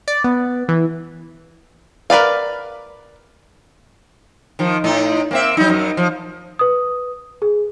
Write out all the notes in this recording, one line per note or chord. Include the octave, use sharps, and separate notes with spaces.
D5
B3
E3
A#4 B4 D5 F5
D#3 F3
A2 D#4
A#3 C4 E5
F#3 D#4
F#2 F#3
F3
B4 D#6
G#4